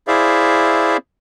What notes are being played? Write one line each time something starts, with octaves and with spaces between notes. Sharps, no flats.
E4 G#4 C5 D5 E5 F5